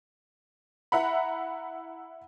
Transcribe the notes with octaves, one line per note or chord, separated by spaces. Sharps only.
E4 E5 F#5 A#5 B5